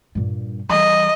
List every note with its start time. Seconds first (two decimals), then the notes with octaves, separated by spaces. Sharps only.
0.15 G2 A#2
0.69 E3 G3 D#5